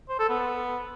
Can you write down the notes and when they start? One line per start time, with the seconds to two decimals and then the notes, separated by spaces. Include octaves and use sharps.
0.09 C5
0.19 A4
0.30 B3